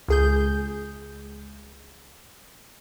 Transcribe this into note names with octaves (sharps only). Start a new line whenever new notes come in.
C#2 G#4 G6